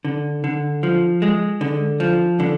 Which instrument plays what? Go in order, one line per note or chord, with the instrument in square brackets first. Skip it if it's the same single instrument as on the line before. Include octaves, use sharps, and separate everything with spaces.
[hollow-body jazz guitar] D3
D3
F3
G#3
D3
F3
D3